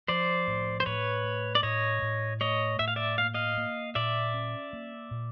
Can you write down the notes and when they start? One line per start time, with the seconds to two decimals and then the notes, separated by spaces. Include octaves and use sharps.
0.08 F3 C5 D5
0.47 A2
0.80 C5
0.86 A2 B4 C#5
1.24 A3
1.55 D5
1.63 A2 C#5 D#5
2.02 A2
2.41 A3 C#5 D#5
2.79 A2 E5
2.88 F5
2.96 D5 E5
3.18 A#3 F5
3.34 D#5 F5
3.57 A#3
3.95 A#2 D5 E5
4.34 C#4
4.73 A#3
5.11 A#2